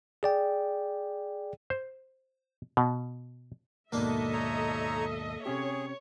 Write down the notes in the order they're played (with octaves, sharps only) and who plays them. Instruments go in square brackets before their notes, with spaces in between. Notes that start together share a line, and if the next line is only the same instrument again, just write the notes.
[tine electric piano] G#4 D5 G5
[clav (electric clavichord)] C5
B2
[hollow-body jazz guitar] D#2 G#2 B2 [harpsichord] A#3 D4 [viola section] A4 D#5 E5
[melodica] D#4 C#5 A#5
[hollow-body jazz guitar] C3 C#4 G4 [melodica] G#4 [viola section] C#5